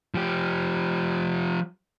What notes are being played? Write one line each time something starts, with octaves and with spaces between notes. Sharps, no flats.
F3 G4